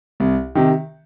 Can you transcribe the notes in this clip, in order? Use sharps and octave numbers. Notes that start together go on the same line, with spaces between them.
C2
C3 D#3